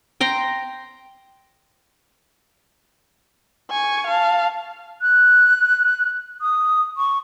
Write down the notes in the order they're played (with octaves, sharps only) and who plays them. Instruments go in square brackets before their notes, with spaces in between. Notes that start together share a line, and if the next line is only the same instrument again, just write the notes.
[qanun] G5 A#5 C6
[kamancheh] G#5 C#6
F5 A5
[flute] F#6
D#6
C#6